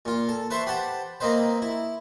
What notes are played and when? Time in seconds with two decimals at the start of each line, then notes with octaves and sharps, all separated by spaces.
0.05 A#2 F4
0.29 A4
0.50 B4 C5 E5 A5 C6 C#6
0.67 G4 B4 C5 F#5 A5
1.20 A#3 C4 D#4 B4 C5
1.62 E4